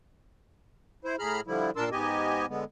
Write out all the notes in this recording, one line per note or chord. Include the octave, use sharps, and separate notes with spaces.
E4 C5
A2 G#4 A#5 B5 F6
D3 F3 G3 E4
A#2 D4 A#4 A5 C6 E6
G#2 B3 G4 D#5 G#5
D3 G#3 B3